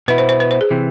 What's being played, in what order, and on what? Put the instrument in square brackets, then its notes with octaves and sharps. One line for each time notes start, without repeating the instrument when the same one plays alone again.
[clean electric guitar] B2 B3 E4 [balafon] B4
[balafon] C5
C5
B4
C5
G#4
[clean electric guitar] C3 E3